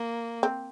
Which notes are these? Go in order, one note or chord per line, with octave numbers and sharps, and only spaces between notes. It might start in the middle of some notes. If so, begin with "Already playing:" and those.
Already playing: A#3
C4